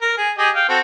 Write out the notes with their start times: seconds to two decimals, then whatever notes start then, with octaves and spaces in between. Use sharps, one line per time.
0.01 A#4
0.17 G#4
0.38 G4 G#4 D#5
0.55 F5 G5
0.69 C4 F#4 A4